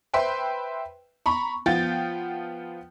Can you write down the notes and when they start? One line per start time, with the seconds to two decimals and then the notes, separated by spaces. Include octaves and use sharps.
0.14 B4 C5 E5 G5 C6
1.26 A#5 B5 C#6
1.66 F3 B3 F4 G5 G6 A6